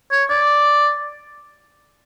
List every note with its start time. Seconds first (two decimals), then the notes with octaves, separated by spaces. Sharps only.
0.11 C#5
0.30 D5